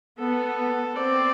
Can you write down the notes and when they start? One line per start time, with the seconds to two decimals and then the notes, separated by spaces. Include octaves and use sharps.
0.19 B3 A4
0.95 C4 D5